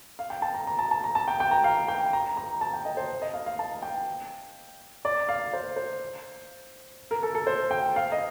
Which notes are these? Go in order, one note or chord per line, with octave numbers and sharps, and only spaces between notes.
F5
G5
A5
A#5
A#5
A5
A5
A#5
A5
G5
G5
A#5
F5
G5
A#5
A#5
A5
G5
D#5
C5
D#5
F5
F5
A5
G5
D5
F5
C5
C5
A#4
A4
A4
C5
G5
F5
D#5